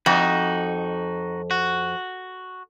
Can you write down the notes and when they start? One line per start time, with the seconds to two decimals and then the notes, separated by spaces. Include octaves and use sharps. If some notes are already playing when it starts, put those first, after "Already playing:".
0.06 F2 D#4 F#4
1.51 F#4